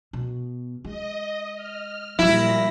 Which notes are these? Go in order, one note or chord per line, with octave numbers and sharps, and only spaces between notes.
B2
G#3 D#5
F6
A#2 F3 G3 E4 A#6